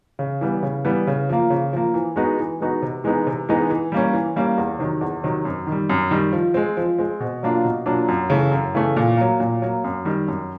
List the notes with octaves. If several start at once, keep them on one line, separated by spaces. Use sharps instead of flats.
C#3
E3 G3 B3
C#3
E3 G3 B3
C#3
F3 A#3
C#3
F3 A#3
E3
G#3 B3 D#4 F#4
E3
G#3 B3 D#4 F#4
C3
E3 G#3 B3 D#4
C3
E3 G#3 B3 D#4
E3
G3 A#3 C#4
E3
G3 A#3 C#4
E2
C3 D#3 F#3
E2
C3 D#3 F#3
F#2
D#3
G3
F#2
D#3 G3
F3
G#3 C4
F3
G#3 C4
B2
F#3 A#3 D4 F4
B2
F#3 A#3 D4 F4
F#2
C#3 E3 A3
F#2
C#3 E3 A3
A#2
F#3 A#3
A#2
F#3 A#3
F#2
D#3 G3
F#2